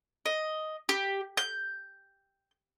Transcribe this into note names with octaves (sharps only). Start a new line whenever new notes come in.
D#5
G4
G6